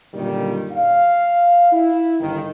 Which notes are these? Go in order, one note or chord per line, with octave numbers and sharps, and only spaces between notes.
F#2 A#2 D3 D#3 G3
F5
E4
G1 D#3